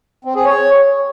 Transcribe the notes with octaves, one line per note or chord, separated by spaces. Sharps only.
C4
G#4
C#5